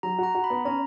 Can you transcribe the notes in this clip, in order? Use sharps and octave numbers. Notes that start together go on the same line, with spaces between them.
F#3 A#5
F#4 A#5
F#4
B5
B3
C#4 A#5